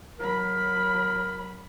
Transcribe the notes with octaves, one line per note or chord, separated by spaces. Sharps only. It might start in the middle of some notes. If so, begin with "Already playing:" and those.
F#3 A#4 B5